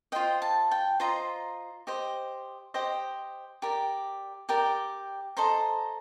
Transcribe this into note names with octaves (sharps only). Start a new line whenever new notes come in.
F4 C5 D#5 G5
A5
G5
F4 C5 D#5 A#5
G4 C5 D#5
G4 C5 D#5
G4 A#4 D5
G4 A#4 D5 G5
A4 C5 D#5 A#5